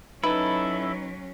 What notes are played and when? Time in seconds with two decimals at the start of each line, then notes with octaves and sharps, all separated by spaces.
0.24 F#3 C#4 D#4 E4 A4 B4